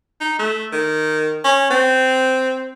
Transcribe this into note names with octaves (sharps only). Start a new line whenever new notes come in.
D#4
A3
D#3
C#4
C4